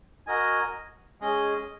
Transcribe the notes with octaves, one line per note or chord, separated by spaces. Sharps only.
F#4 A#4 D#5 G#5
G#3 C#4 G#4 D#5